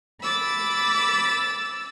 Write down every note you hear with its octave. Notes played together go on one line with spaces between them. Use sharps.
B5 D6 E6 A6